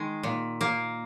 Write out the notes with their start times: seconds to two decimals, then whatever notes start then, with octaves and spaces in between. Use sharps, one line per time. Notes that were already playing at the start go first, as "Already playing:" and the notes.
Already playing: D#3 G#3
0.23 A#2
0.61 A#3